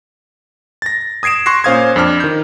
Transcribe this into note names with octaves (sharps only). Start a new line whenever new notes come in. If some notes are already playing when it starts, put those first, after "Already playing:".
A6 A#6
D#6 G#6 C7 D7 E7
C6 C#6 F#6 A#6 C7
A#2 C#4 C5 F5 D#6 G#6
F2 D4 D6 F6
D#3 G6